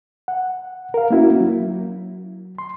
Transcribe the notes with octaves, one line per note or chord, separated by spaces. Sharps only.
F#5
A#4 F5
A#3 C#4 E4 F#4
F#3
C6